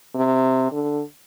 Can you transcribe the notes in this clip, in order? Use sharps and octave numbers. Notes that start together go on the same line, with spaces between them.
C3
D3